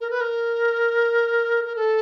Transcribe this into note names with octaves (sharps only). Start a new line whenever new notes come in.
A#4
B4
A#4
A#4
A4